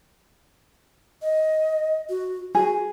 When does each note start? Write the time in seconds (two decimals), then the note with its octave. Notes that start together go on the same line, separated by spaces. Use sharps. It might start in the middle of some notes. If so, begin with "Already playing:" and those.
1.22 D#5
2.09 F#4
2.55 F#4 G#4